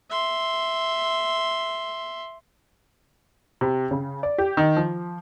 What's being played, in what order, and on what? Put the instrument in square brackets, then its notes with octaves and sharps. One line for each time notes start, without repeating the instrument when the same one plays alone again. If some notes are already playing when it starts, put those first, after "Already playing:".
[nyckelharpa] E5 C6
[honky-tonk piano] C3
C#3
D5
G4
D#3
F3